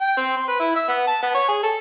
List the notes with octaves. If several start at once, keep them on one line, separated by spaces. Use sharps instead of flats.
G5
C4
C6
B4
E4
E5
B3
A5
B3
C#5
G#4
A4